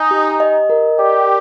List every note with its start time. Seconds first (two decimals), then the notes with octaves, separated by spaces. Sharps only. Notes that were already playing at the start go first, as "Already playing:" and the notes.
Already playing: D#4 G#5
0.11 G4
0.40 D#5
0.69 A#4
0.99 G4 D5